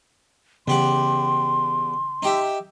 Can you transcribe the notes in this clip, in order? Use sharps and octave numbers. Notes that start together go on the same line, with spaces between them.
E2 C#3 G4 F#5 C6
D#4 G4 E5